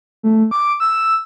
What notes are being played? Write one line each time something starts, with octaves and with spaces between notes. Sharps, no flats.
A3
D6
E6